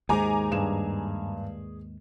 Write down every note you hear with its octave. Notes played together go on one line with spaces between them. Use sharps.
D#2 G#2 G#3 D#4 G#5 A#5 D6
G2 G#4 E7